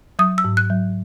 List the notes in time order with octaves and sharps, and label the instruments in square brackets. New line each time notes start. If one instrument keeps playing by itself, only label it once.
[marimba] F#3 D#6
E6
G#2
F#6
F#3